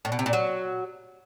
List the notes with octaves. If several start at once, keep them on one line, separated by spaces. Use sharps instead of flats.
A2
B2
C3
A#2
F#3